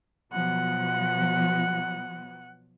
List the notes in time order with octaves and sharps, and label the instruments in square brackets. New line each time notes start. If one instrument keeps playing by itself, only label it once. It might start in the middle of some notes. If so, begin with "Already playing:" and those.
[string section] B2 F3 F#3 [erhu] F#5